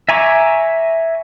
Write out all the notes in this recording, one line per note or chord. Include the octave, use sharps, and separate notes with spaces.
E5 G#5 A#5 C#6 D6